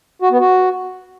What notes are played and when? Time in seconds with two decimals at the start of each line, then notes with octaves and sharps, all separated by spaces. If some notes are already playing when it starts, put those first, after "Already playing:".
0.22 F#4
0.31 B3
0.40 F#4